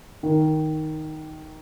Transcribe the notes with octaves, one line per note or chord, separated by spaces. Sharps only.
D#3